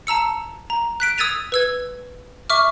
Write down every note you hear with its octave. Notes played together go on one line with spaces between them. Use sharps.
A5 A#5 E6 C#7
A#5
F#6 B6 D7
D#6 E6 G#6 A6 D#7 F7
B4 E6 G#6
E5 C#6 D6 F6